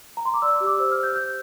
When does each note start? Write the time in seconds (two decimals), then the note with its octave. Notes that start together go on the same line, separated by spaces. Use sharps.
0.17 A#5
0.25 C6
0.34 D6
0.42 D5 E6
0.55 E6
0.61 G4
0.67 D6
0.79 C5 E6
0.92 F6
0.97 C5
1.03 G6
1.16 G4 G6